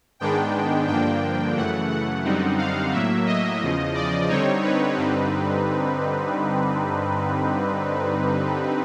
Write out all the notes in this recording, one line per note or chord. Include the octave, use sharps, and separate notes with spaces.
G#2 D#3 G#3 B3 D4 G5
G2 D3 F3 A#3 D4 G5
F#2 C#3 E3 A3 F#5
F#5
F#2 D3 G3 C4 D#4
F5
A2 F#3 A#3 E5
D#5
E2 C#3 F3
D5
D3 G3 C4 D#4 C#5
B4
G2 D3 G3 C4 D#4